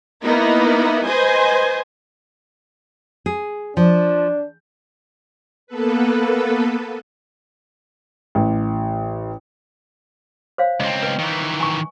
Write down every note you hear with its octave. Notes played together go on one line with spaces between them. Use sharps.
A#3 B3 D#4 E4
B4 C5 D#5 G#5
G#4
F3 D4
A#3 B3 A4 B4
A1
C5 C#5 F5
C#2 C4 D#5
B4 D#5
D#3 E3
G#5 C#6